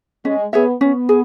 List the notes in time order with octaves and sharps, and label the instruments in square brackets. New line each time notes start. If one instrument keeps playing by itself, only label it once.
[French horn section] G#3 [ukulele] C#4
[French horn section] B3 [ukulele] G#4 C#5 E5
[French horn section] B3 [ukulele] C#4
[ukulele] G#4